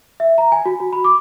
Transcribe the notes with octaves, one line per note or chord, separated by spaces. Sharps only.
E5
A#5
G#5
F#4
F#4
B5
D6